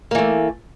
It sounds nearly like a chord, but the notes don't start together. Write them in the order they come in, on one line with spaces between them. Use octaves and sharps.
A#3 E3 A3